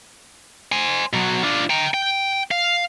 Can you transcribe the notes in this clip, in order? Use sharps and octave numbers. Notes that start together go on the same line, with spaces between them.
C5 G#5
B2 F#3
D4 F4
G5 A#5
G5
F5